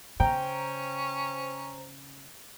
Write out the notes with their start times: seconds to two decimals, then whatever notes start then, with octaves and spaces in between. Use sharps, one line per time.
0.20 C#3 C#4 C5 G5 A#5